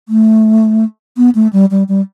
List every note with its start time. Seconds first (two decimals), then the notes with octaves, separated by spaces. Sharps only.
0.09 A3
1.17 B3
1.35 A3
1.53 G3
1.71 G3
1.89 G3